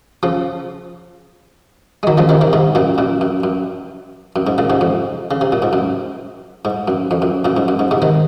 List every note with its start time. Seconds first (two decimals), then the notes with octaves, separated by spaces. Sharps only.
0.23 C#3 F3
2.03 G#3
2.07 D#3 F#3
2.18 C#3 F3
2.29 C3 D#3
2.41 C3 D#3
2.53 G#2 C3
2.75 F#2 A#2
2.98 F#2 A#2
3.21 F#2
3.44 F#2
4.36 F#2
4.47 G#2
4.58 A#2 C#3
4.70 G#2 C3
4.81 F2
5.31 C#3
5.41 C3
5.52 A#2
5.62 G#2
5.73 F#2
6.65 G#2
6.88 F#2
7.11 F2
7.22 F#2
7.45 F#2 A#2
7.57 G#2
7.68 F#2
7.79 G#2
7.91 G#2 C3
8.02 C3 D#3